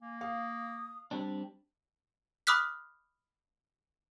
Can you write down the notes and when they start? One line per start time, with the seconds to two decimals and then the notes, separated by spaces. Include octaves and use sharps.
0.02 A#3 G#5
0.21 F5 D#6
1.11 G3 C4 D4
2.47 B5 D6 D#6 F6 F#6 B6